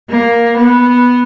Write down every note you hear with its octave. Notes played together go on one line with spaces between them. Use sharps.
A#3
B3